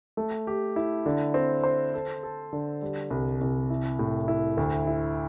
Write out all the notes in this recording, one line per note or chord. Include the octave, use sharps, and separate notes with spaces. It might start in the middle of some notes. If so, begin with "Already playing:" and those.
A3
G4
E4
D3
C4
C5
A4
A4
D3
G3
C2
C2
E4
A2
E4
D2
E4